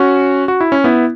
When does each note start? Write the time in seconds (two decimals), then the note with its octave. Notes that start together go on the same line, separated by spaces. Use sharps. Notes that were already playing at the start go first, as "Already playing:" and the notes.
Already playing: C#4 F#4
0.48 F#4
0.61 E4
0.72 C#4
0.84 B3 E4